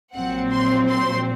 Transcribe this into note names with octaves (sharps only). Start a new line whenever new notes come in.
A#1 A#2 F#3 C4 F#5
C6
C6